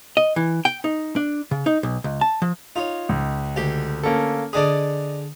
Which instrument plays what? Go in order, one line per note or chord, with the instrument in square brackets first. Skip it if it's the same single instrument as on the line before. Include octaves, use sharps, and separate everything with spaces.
[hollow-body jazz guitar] D#5
E3
G5
D#4
D4
C#3
D#4
B1
C#2
A5
F3
[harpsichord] D#4 C#5 [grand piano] F4
[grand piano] C#2
[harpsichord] D2 G4
[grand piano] A#3 C#4 A4
[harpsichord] D3 D4 G#4 [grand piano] D5 D#5 D#6